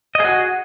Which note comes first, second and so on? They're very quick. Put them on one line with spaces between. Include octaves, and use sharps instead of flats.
D#5 G#4 F#4